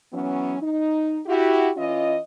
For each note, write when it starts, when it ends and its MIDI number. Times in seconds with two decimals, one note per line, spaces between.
0.13 0.56 52
0.13 0.56 54
0.13 0.56 59
0.13 0.56 61
0.61 1.19 63
1.26 1.71 64
1.26 1.71 66
1.26 1.71 67
1.77 2.17 52
1.77 2.17 61
1.77 2.17 65
1.77 2.17 75